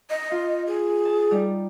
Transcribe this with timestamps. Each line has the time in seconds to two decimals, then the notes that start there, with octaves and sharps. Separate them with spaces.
0.10 D#5
0.31 F4
0.67 G#4
1.05 A5
1.31 G3 D#4